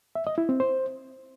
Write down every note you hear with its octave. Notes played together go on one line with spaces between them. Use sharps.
E5
D#5
E4
C4
C5